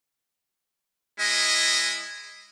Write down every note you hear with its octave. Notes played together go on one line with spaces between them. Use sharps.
G#3 E4 D#5